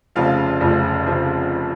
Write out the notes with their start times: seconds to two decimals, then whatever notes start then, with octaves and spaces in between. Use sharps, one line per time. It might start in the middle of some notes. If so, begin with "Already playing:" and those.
0.15 F1 F2 C#3 F3 F4 F5
0.60 F1 F2 C#3 F3
1.07 C#3 F3